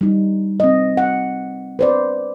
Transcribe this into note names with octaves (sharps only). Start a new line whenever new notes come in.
G3 D#4
C4 D#5
F#5
B4 C5 D5